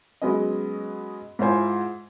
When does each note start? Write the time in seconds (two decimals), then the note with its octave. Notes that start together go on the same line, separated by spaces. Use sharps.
0.22 F#3 G#3 B3 C#4 D#5
1.39 G#2 E4 F4 C5 G#5